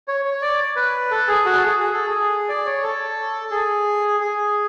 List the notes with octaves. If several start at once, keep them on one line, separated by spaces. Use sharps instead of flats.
C#5
C#5
D5
B4
A4
G#4
F#4
A4
G#4
G#4
A4
G#4
D5
C#5
A4
G#4
G#4